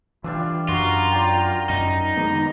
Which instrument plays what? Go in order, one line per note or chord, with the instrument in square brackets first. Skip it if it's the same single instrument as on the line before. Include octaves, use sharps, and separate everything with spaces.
[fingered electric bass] E3 [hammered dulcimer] G3 D4 E5 [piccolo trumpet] F4
[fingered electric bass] F#2 [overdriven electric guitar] F4 [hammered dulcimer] F#4 A#4 [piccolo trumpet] A#5
[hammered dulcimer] D5 G5
[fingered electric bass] F#2 [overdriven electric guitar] D#4
[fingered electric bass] D#3 G#3 B3 [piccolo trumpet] A#5